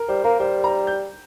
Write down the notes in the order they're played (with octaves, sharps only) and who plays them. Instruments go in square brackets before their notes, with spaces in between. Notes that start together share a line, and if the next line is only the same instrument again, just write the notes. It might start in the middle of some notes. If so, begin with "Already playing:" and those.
Already playing: [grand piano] A#4
[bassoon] G3 [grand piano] C5
[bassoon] A#3 [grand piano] A#4
[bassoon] G3 [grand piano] C5
[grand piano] A#5
G6